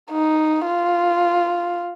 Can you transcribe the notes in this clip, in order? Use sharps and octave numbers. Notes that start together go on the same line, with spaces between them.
D#4
F4